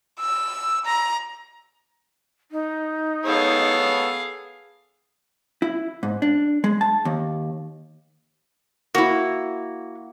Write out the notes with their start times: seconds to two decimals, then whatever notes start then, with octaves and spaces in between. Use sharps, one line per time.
0.20 E6
0.85 A#5
2.52 D#4
3.25 B3 G#4 A4 C#5 F5
5.62 E4
6.03 G#2
6.22 D4
6.64 G#3
6.81 A5
7.05 D#2
8.95 A#3 E4 F#4